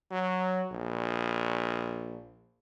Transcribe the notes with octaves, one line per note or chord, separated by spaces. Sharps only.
F#3
A#1